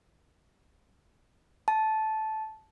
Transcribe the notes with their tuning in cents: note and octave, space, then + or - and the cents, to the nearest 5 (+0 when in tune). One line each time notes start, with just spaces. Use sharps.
A5 -10